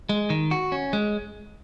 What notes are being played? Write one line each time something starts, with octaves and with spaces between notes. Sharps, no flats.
G#3
D#3
F#4
C#4
G#3